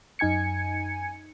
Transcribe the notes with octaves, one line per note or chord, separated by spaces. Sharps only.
F#2 D#4 G#5 G#6 C#7